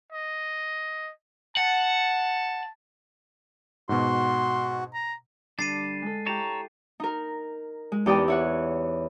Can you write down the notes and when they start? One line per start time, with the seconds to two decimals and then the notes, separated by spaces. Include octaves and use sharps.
0.12 D#5
1.57 F#5 A5
3.89 G#2 B2 F#4 C6
4.94 A#5
5.59 D3 G3 D4 A6 C7 D#7
6.02 G#3 A4
6.26 E4 G4 C#5 A5 A#5
7.00 D#4 A#4
7.92 G#3
8.06 E2 D#4 G4 D5 G5 D#6
8.28 E4 C#5 F#5